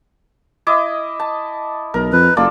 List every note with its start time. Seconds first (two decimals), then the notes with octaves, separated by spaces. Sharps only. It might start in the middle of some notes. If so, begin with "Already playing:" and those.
0.67 E4 D#5 D6
1.19 A5
1.94 B1 A#4
2.12 F2 B4
2.37 F#1 A#3 F4 A4 D5